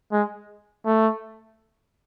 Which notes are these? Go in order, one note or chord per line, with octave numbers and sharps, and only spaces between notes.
G#3
A3